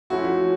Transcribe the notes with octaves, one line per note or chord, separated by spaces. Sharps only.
F3 A3 C#4 E4 F#4